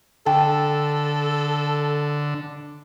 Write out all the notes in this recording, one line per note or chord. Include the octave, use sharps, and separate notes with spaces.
D3 A4 G5 A5